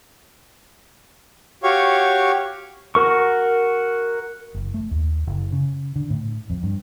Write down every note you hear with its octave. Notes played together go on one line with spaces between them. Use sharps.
F#4 G4 C#5 F5 C#6
F#4 A#4 C#6
F#1
A3
D#2
F#1
C#3
D3
A2
F2
G2